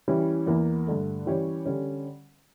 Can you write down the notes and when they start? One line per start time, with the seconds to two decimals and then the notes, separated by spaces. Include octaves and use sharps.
0.08 E3 G3 C#4 E4
0.47 E2 E3 A#3 E4
0.87 G2 D3 A3
1.26 E3 G3 C#4 G4 C#5
1.66 D3 G3 C#4